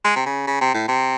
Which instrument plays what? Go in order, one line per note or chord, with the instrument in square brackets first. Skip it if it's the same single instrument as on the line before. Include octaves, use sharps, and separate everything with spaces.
[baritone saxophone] G#3
C3
C#3
C#3
C3
A2
C3